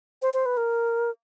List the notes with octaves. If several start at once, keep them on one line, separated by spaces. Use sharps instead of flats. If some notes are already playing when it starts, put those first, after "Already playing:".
C5
C5
B4
A#4